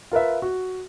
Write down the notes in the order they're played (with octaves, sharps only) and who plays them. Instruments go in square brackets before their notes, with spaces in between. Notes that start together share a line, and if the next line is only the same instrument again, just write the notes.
[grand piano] F4 A#4 B4 E5
F#4